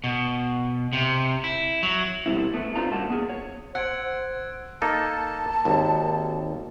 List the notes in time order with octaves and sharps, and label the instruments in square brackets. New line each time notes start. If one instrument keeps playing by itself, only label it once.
[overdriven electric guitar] B2
C3
E4
F#3
[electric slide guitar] B2 G3 C4 E4
A3 B3
C4 D4 D#4 F4 A#5
G2 A#3 D#4 F#4 A5
B3 G#4
C#5
[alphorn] C5 [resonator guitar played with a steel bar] F#5 [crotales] E6 G#6 D7 [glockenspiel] F#6
[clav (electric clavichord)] A#3 D#4 A4 [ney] A5
[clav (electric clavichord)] G#1 D#2